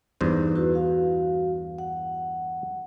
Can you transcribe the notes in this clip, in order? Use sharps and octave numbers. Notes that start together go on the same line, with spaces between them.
E2 G2 D#4 C5
E4 F#4 B4
F#4 F5
F#5